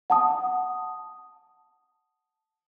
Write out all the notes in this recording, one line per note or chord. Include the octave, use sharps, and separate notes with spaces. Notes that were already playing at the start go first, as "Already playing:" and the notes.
F#5 A5 D#6